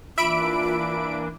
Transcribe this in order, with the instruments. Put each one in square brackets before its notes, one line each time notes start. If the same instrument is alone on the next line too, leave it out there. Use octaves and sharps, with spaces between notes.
[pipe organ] E3 A#3 D4 [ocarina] F4 [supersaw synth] E5 B5 D7 [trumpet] D6